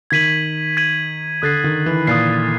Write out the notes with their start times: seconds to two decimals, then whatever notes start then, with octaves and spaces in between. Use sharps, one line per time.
0.11 D#3 G#6 B6 D#7 F#7
0.77 G#6 B6 D#7 F#7
1.42 D3 D#6 F#6 A6 C7
1.64 D#3
1.86 E3
2.07 A#2 D#6 F#6 A6 C7